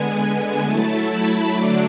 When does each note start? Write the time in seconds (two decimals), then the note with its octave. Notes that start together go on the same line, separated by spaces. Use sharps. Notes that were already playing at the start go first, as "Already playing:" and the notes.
Already playing: D3 G#3 B3 G#5
0.64 F#3 A3 E4 A5
1.08 B5
1.52 D3 F#3 A3 D4 D6